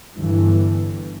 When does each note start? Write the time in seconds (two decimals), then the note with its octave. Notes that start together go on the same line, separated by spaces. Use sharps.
0.18 G1 G2 E3